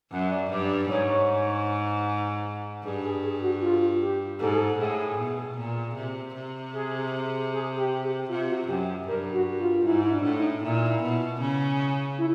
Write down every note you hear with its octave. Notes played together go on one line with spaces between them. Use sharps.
F#2 F#5
D5
G2 D5
G#2 C#5
G2 G#4
G#4
G#4
F#4
F4
G4
G#2 A4
G#4
A4
A2 G#4
B2
A#2
C3
C3
G#4
G#4
G4
G4
C3 F4
F#4
F#2 G4
G2 A#4
F#4
F4
G#2 E4
D4
A2
D#4
A#2 E4
B2
C#3
E4